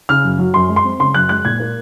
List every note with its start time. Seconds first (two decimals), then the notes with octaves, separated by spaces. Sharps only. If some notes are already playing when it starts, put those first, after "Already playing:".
0.09 C#3 F6
0.24 F#2
0.38 F#3
0.54 F#2 C6
0.69 G#3
0.76 C6
0.84 C4
0.99 C#3 C6
1.14 F#2 F#6
1.29 G#3 F#6
1.45 A#2 G#6
1.60 A#3